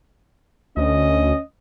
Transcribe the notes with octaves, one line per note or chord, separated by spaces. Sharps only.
D2 C#4 D#5